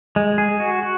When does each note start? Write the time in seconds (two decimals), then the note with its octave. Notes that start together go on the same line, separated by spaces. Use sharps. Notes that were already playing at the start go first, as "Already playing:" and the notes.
0.16 G#3
0.38 G#4
0.60 F#4
0.83 F#4